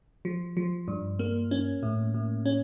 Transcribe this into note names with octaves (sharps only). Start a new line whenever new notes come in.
F3
F3
G2
A#3
C#4
A2
A2
C#4